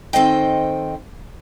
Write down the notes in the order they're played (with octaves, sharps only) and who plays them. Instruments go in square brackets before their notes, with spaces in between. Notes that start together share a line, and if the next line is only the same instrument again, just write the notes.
[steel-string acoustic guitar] D#3 C4 A4 C5 D#5 G5